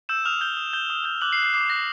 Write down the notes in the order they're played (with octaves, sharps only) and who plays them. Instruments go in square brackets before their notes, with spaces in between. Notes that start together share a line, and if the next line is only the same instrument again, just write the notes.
[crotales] E6 G6 E7
D#6 F6 F7
G6 G7
D#6
G6 G7
D#6
G6
D6 F#6 F#7
C7
F#6
C7
D6 C7
F#6 A#6